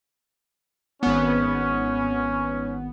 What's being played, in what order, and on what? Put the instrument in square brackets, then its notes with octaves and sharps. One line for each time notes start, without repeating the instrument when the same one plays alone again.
[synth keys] G#1 B3 [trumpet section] C#4